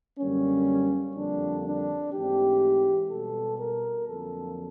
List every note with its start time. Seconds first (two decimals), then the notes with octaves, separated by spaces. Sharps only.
0.19 F#2 D3 G3 A#3 C#4
1.16 F2 D3 G3 A#3 D4
1.64 D4
2.12 G#2 E3 A3 C4 G4
3.09 B2 G3 B3 A4
3.58 A#4
4.07 F2 D3 F#3 A#3 A4